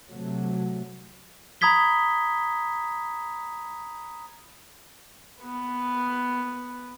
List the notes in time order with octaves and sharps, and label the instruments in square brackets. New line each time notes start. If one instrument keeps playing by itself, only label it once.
[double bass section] C3 F#3 A3
[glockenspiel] A#5 B5 D#6 G#6 B6 G7
[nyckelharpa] B3 B4